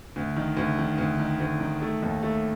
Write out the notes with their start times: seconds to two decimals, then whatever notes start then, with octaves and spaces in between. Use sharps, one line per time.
0.16 D2
0.36 D#3
0.57 D2
0.79 D#3
0.98 D2
1.19 D#3
1.40 D2
1.60 D#3
1.82 A3
2.03 D#2
2.23 A3